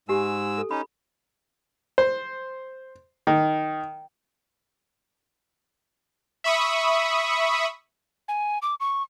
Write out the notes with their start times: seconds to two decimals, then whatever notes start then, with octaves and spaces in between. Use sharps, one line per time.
0.09 G#2 G#3 G4 G#5 E6
0.58 A4
0.71 C#4 D#4 B5
1.98 C5
3.27 D#3
6.44 E5 B5 C#6 D#6
8.28 G#5
8.62 D6
8.80 C#6